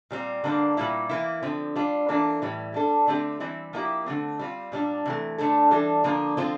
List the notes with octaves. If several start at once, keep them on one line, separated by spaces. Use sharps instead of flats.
A#2 G3 C4
D3 G3 A#3 D4
A#2 G3 A#3 E4
E3 A#3 E4
D3 F3 C4
G3 D4 F4
E3 A#3 D4 F4 A4
A2 E3 G3
G3 D4 A4
D3 A3 C4 G4
E3 G3 C4 E4
F3 A#3 E4 G4
D3 A3 C4
G3 C4 F4
A#2 G3 D4
C3 E3 A3
D3 A3 D4 A4
E3 G3 D4 A4
D3 F3 A#3 D4
D3 F3 C4 F4